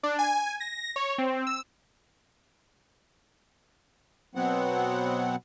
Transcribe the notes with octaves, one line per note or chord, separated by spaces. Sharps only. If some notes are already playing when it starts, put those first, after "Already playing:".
D4
G#5
A#6
C#5
C4
E6
B2 F#3 B3 C4 F#5